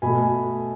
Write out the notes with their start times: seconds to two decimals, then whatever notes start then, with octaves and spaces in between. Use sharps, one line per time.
0.02 B2 A3 G#5 B5